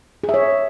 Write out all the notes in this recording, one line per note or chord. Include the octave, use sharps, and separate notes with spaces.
G#4
E5
C#5